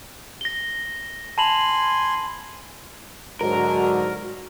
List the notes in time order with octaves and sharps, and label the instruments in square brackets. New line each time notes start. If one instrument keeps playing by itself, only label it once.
[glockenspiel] A#6 G7
[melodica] G#5 C6 [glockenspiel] A5 B5 F#7
[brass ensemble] G#2 D3 F#3 [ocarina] F#4 [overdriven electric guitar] A#4